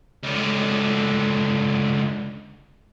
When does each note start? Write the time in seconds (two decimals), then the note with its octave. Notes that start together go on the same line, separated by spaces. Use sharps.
0.23 C#2 D3